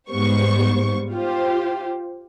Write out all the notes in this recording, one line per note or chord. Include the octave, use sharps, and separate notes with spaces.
G#2 G3 B3 C5 C#6
F4 G4 C5